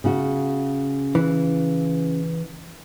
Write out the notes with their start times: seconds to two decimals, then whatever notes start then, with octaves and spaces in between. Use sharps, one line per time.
0.04 C#3 F#4
1.15 E3